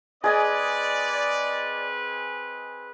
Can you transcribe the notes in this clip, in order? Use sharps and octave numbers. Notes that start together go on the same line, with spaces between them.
C4 G#4 B4 D5 D#5 G#5